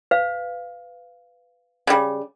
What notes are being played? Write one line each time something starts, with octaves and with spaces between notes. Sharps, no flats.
B4 F5
C#3 G3